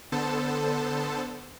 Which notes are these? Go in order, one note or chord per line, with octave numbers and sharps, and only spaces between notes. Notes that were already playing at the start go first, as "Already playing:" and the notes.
D3 B3 A4 C5 A5